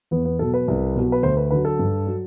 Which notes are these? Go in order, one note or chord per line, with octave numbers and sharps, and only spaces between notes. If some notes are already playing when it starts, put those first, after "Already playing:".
E2 B3
B3
B2 F#3 A4
B4
C2
B2 F#3
B4
D2 C5
B4
D3 F#3 B4
A4
G2
F#3